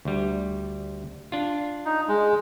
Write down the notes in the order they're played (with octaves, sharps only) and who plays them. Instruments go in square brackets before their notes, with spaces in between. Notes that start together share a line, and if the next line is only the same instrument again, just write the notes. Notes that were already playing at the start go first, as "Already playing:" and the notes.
[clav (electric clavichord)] D2 G3
D4 F4
[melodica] D#4
G#3